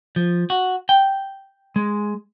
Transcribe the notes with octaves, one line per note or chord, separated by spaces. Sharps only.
F3
F#4
G5
G#3